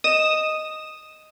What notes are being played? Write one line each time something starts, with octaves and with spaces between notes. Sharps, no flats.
D#5 D#6 E7